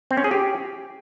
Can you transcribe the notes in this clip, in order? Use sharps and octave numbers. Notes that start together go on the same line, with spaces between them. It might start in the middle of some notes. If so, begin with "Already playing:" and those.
C4
C#4
G#4
G4